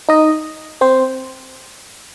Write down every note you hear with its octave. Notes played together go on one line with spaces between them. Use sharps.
D#4 D#5
C4 C5